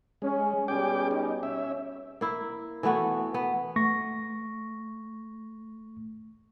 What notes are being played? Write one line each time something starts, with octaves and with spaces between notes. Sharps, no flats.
G#3 C#4
B2 G3 C#4 G#4 G5 D6
D#4
C#4 E5
A#3 E4
E3 A3 B3 F#4
B3
A3 C#6 A#6